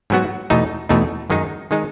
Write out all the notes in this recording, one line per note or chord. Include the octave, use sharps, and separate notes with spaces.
G#2 F#3 B3 F#4
E2 B2 A3 D#4
E2 B2 A3 D#4
F#2 D#3 G#3 D#4
D#3 G#3 D#4